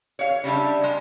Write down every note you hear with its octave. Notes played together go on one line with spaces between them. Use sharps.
C#5 F5
C#3 G3 D4 E5
G#3